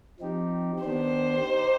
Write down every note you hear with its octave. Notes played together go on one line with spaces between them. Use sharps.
F3 C4 D#4 G4
D#3 B3 D4 G4 C5
D#4 G4